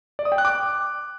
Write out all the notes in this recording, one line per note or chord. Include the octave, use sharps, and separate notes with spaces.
D5
D#6
G5
F#6
D6